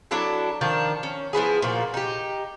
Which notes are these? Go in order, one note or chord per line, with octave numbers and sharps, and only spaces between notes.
F#3 D4 E4 A4
D#3 F3 D4
C#4
F3 B3 E4 G#4
A#2 F3 F#4
D#4 G4